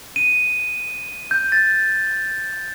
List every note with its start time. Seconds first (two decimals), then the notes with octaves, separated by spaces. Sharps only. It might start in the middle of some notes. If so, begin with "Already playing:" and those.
0.16 D#7
1.31 G6
1.52 A6